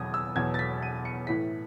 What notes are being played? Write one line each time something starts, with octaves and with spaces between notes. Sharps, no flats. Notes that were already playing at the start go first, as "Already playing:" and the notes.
Already playing: E2 B2 F#3 D#6 G#6
E6
E2 B2 F#3 G#6
A6
B6
D#7
C#7
A2 E3 B6